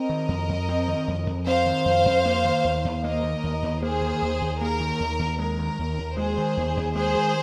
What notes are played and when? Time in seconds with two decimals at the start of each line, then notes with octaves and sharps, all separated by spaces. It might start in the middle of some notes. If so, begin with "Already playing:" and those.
Already playing: C4 A#4 D#5
0.09 D#3
0.29 F2
0.49 F2
0.69 C4
0.88 D#3
1.08 F2
1.27 F2
1.46 C4 C5 F5
1.66 D#3
1.85 F2
2.06 F2
2.26 A#3
2.45 D#3
2.64 D#2
2.85 D#2
3.03 A#3 A#4 D#5
3.23 D#3
3.44 D#2
3.62 D#2
3.82 A#3 G#4 C5
4.01 D#3
4.22 D#2
4.42 D#2
4.61 A#3 A#4
4.80 D#3
5.00 D#2
5.19 D#2
5.39 G#3 A#4
5.59 D#3
5.79 D#2
5.98 D#2
6.17 G#3 G#4 C5
6.38 D#3
6.57 D#2
6.77 D#2
6.95 G#3 G#4 C5
7.15 D#3